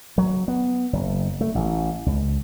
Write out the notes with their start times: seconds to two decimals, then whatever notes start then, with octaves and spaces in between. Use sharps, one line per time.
0.18 F#3
0.48 B3
0.93 F#1
1.41 A3
1.55 A1
2.06 C#2